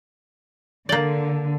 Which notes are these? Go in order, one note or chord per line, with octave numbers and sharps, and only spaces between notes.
D3 A#3 D5